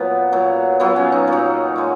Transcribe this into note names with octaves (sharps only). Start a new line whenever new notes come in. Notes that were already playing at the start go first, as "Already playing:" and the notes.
Already playing: A#2 F#3 B3
A#2 F#3
A#2 F#3 B3
C#4
D#4
A#2 F#3
A#2 G#3